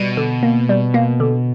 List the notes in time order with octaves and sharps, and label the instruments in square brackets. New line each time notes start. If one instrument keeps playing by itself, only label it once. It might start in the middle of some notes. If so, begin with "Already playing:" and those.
Already playing: [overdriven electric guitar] B2 [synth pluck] G3
[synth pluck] D3
A#3
G3
A#3
D3